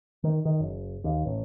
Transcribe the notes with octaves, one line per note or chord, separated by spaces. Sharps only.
D#3
D#3
F#1
D#2
A1